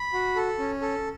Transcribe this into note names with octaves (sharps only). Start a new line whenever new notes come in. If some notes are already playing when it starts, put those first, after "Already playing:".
Already playing: B5
F#4
A4
C#4
A4